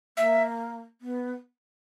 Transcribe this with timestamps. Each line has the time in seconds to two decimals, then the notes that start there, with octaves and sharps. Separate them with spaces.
0.17 A#3 E5
1.01 B3